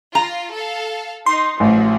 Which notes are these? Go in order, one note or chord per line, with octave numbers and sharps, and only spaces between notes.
F4 A#5
A4 F5
D#4 C6
A1 F3 F#3